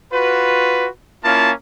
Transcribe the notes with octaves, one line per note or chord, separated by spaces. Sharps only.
F4 F#4 B4
A#3 C#4 E4 F4 A5